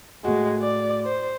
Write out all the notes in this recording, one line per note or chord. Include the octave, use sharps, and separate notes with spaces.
A2 G#3 F#4
D5
C5